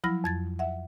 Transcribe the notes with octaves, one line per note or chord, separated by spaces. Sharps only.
F3 F#3 E4 B5 F6 A#6
F2 G#6 A6
E5 F#5